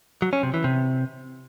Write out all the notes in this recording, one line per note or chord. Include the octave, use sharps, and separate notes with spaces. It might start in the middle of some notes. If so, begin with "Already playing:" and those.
F#3
C#4
C3
E3
C3